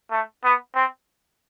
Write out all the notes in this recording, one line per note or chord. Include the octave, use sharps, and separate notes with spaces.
A3
B3
C4